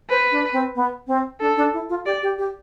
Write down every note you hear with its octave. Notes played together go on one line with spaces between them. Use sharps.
B4 C5
D4
C4
B3
C4
D4 A4
D4
E4
F4
G4 D5
G4
G4